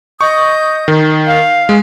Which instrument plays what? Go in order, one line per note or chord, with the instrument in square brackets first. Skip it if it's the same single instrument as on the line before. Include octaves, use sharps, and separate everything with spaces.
[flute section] D#5 D#6 G6 [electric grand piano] C#6
[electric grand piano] D#3
[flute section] F5
[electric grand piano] G#3